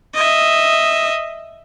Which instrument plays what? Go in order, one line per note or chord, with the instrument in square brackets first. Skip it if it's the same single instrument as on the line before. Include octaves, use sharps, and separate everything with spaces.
[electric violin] D#5 E5